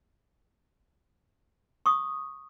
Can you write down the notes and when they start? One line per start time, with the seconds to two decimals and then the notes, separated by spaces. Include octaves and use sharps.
1.86 C#6 D#6